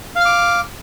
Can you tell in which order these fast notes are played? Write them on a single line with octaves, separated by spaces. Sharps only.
F5 F6 D6